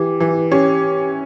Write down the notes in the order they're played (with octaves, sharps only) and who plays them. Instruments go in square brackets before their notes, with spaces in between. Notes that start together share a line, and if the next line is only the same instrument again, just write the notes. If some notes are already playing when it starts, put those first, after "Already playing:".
Already playing: [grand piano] E3 [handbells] G4
[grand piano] E3
[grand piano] C#4 [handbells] G4